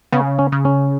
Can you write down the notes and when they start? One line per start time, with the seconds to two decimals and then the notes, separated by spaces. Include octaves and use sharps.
0.12 C#3 B3
0.39 C#4
0.52 C#3
0.65 C#4